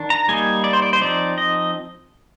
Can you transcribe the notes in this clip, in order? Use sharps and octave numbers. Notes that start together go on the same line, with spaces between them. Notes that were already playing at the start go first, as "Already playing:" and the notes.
Already playing: D#3 D4
A#5
G3 A#3 D#4 G#5
D5
C5
D5
C5
F3 C4 D#4 D5
D#5